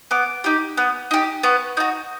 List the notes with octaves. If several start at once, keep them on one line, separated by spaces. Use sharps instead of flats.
B3 D6
D#4 G4
B3
D#4 G4
B3 C#6
D#4 F#4